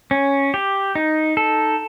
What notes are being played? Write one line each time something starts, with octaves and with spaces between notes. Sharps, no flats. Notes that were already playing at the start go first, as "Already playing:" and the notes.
C#4
G4
D#4
A4